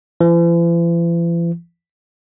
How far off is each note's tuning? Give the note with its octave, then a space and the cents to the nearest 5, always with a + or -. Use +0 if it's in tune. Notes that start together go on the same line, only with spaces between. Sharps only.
E3 +45